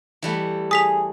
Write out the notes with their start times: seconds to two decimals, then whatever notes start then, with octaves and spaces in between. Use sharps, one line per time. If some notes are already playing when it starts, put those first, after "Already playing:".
0.22 E3 G3 A3
0.71 G#4 D#6 B6 F7